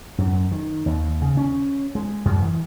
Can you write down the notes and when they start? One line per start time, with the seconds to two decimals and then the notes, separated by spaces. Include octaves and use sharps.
0.18 F#2
0.51 D#3
0.86 D#2
1.22 C#3
1.37 C#4
1.95 G#3
2.25 F#2
2.42 E3